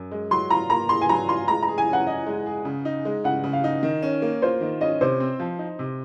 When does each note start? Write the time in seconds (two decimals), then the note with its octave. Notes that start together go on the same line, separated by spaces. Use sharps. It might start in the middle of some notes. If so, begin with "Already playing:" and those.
Already playing: F#2
0.12 G#3
0.31 F#3 C6
0.50 F4 A#5
0.70 A#3 A#5
0.89 G#4 C6
1.01 G#5
1.09 F#3 A#5
1.28 F4 C6
1.48 G#3 A#5
1.62 A#5
1.68 G#4
1.78 G#5
1.88 C#4 F#5
2.07 D#5
2.27 G#3
2.46 G#4
2.65 C#3
2.85 D#4
3.05 G#3
3.24 C#3 F#5
3.44 C#3
3.53 F5
3.64 D#4
3.83 D#3
4.03 C#4
4.22 A#3
4.42 F4 C5
4.61 D#3
4.81 C#4 D#5
5.01 C3 C5
5.20 C4
5.40 F3
5.59 D#4
5.79 C3